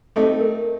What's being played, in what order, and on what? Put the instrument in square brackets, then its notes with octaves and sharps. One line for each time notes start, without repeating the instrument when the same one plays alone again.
[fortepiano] A3 C4 D#4 [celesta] A4
[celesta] A#4